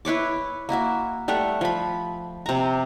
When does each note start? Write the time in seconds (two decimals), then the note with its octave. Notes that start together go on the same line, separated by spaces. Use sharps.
0.05 E4 B4 C#5 D6
0.69 A#3 E4 F#4 E5
1.28 G3 A3 E5 F#5
1.61 F3 B5
2.46 C3 A#5